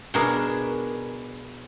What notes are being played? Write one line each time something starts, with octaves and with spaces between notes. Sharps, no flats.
B2 D4 G#4 A#4